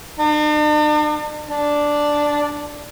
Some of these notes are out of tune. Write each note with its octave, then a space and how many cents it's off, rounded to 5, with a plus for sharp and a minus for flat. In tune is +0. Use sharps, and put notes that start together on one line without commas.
D4 +45
D4 +0